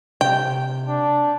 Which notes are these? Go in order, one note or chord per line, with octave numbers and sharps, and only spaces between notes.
C3 G5
D4